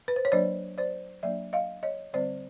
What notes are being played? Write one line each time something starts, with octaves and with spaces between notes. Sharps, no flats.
B4
C5
C#5
F#3 A#3 D4 C5 D5
C5 D5
F#3 A#3 D4 D5 E5
D#5 F5
C#5 D#5
D3 G3 C4 C5 D5